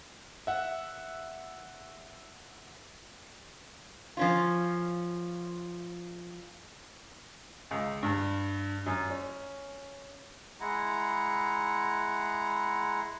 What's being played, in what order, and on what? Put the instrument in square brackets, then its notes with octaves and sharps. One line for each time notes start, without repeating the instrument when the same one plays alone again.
[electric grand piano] E5 F#5
[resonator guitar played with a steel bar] F3 C#4 F4
[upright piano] C#2
G2
F#2
C#4
[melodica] G#3 E4 F#5 A#5